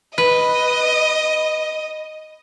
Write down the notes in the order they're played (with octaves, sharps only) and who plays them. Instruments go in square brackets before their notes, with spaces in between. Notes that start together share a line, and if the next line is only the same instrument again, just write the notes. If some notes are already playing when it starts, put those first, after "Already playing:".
[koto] B4 [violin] D#5